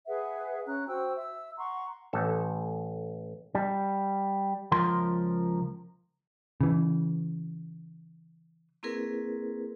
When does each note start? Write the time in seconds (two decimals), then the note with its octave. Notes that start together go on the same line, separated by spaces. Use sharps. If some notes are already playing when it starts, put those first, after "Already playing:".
0.07 G#4 B4 E5 F#5
0.66 C#4 A#5 F#6
0.87 F#4 C5 G5 E6
1.17 E5 E6
1.57 F#5 A#5 C6 C#6
2.13 A1 A4
3.55 G3
4.71 C#2 F3 A#4 C6
6.61 C#3 E3
8.83 A#3 C4 E4 G#4 A#4 B4